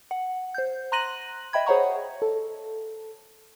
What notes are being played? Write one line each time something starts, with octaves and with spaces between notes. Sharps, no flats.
F#5
C5 G6
A#5 C6 F#6 A#6 D#7 F#7
D#5 E5 G5 B5 G#6
G#4 C5 C#5 F#5 A#5 C#6
A4